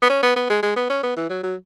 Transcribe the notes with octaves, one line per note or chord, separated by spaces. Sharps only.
B3
C#4
B3
B3
G#3
G#3
B3
C#4
B3
E3
F#3
F#3